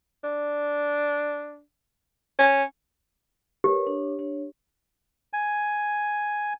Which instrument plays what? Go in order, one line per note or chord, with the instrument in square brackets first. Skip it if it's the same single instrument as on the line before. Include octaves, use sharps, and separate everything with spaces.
[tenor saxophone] D4
C#4
[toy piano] G4 [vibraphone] A#4 B4 C#5
[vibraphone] D4 C#5
D4 C#5
[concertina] G#5